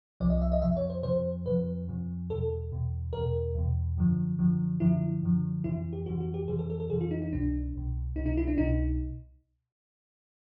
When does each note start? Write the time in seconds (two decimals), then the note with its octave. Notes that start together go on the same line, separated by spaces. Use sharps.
0.20 C2 C3 F3 D5
0.30 D#5
0.42 E5
0.52 D#5
0.62 F2 C3 F3 E5
0.77 C#5
0.90 C5
1.03 F2 C3 F3 C5
1.46 F2 C3 F3 B4
1.88 F2 C3 F3
2.30 E2 B2 A4
2.72 E2 B2
3.13 E2 B2 A#4
3.55 E2 B2
3.97 F#2 D3 F3
4.39 F#2 D3 F3
4.80 F#2 D3 F3 E4
5.23 F#2 D3 F3
5.64 F2 C3 E3 E4
5.93 G4
6.06 F2 C3 E3 F#4
6.20 F#4
6.34 G4
6.48 F2 C3 E3 G#4
6.59 A4
6.70 A4
6.80 A4
6.90 F2 C3 E3 G#4
7.01 F4
7.11 D#4
7.22 D#4
7.32 C2 B2 D4
7.74 C2 B2
8.15 C2 B2 D#4
8.26 D#4
8.37 E4
8.47 D4
8.57 C2 B2 D#4